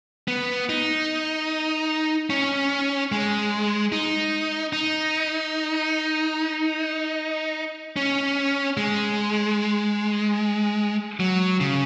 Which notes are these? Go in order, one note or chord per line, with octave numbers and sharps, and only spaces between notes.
B3
D#4
C#4
G#3
D#4
D#4
C#4
G#3
F#3
C#3